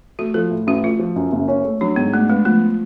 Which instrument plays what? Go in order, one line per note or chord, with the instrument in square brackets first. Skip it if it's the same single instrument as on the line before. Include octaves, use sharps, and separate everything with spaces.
[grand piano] A3 [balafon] F#4
[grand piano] F3 [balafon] A4
[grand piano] A2
[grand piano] A1 [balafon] F#4
[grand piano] A3 [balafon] F4
[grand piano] F3
F#2
F#1
C#4
A3
[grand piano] F#3 [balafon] D4
[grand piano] G#2 [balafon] B3
[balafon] A3 [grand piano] D4
[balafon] G#3 [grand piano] B3
[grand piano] F3 [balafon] A3